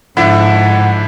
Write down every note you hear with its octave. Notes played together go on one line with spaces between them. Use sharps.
G#2 D3 F3 D4 E4 F#5